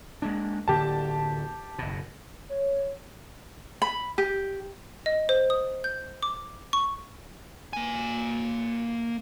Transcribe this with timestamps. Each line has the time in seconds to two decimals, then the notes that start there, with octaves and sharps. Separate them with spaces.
0.22 G#3 A#3 D4
0.68 D1 D3 A#3 G4 A5
1.79 F#1 B2
2.49 C#5
3.82 B5
4.18 G4
5.06 D#5
5.29 C5
5.50 D#6
5.84 G6
6.23 D6
6.73 C#6
7.73 A#3 G#5